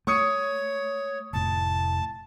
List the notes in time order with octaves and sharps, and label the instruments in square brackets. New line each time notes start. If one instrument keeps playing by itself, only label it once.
[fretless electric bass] A3 [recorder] C#5 [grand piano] C#6 D#6 C#7
[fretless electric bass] F1 A2 [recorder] A5